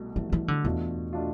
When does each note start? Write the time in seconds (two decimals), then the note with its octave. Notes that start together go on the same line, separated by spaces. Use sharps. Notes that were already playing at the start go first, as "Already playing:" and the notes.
Already playing: C2 B2 A3
0.16 C2 B2 E3 A3
0.33 E3
0.48 D3
0.65 E2 B2 A3 D4 F4
1.13 B2 A3 D4 F4